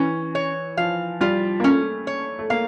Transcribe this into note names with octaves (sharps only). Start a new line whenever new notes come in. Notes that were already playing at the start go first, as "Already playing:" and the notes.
Already playing: E3 C#4
C#5
F3 F5
G3 F4
A#3
A3 C#4
C#5
A3
A#3 F5